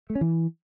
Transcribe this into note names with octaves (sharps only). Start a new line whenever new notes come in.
A3
C#4
E3